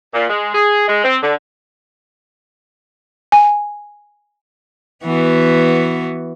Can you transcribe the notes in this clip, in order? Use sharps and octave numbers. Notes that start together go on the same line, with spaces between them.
A#2
G#3
G#4
G#3
C4
D3
G#5
E3 B3 F#4